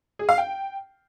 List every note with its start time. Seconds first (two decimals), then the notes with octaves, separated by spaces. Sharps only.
0.19 G#4
0.29 F5
0.38 G5